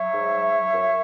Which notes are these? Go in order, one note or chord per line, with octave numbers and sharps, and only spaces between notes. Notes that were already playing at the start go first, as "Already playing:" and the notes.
Already playing: F#3 C#5 E5
G#2
F#3
F#3
F#2